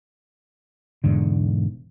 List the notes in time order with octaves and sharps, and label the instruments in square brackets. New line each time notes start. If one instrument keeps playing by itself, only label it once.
[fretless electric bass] E1 E2 G#2 D3